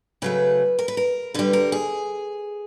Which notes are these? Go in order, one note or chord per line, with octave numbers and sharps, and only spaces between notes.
C#3 F#3 A3 B4
A#4
B4
A#4
D3 G3 B4
A#4
G#4